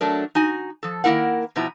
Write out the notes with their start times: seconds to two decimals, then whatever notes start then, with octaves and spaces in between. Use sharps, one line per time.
0.01 F#3 A3 D4 A#4
0.35 D#4 F#4 G#5
0.83 F3 A4
1.04 D#3 A#3 C4 E4 A#4 F#5
1.56 F2 B2 F3 E4 A#5